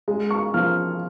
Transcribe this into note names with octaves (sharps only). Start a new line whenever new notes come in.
G#3
C#6
F3 F6